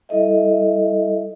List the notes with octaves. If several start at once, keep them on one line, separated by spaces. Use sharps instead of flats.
G3 E4 A4 D#5 E5